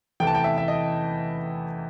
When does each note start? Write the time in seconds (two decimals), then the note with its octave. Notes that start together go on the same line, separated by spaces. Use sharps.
0.20 E2 C3 E3 A3 G5
0.27 A5
0.35 G5
0.44 E5
0.58 E5
0.68 D#5